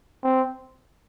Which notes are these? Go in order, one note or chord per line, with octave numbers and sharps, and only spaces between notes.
C4